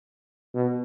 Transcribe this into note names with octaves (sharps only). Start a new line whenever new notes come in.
B2